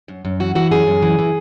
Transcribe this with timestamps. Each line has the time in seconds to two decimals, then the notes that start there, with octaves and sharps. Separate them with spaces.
0.08 F#2
0.25 F#2
0.40 E3 F#4
0.55 E3 F#4
0.71 F#2 G#4
0.87 F#2
1.02 E3
1.19 E3